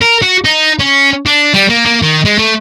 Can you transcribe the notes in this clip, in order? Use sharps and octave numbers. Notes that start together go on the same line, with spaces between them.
A#4
F#4
D#4
C#4
D4
G3
A#3
A#3
D#3
G#3
A3